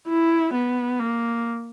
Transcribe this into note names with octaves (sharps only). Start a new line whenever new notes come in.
E4
B3
A#3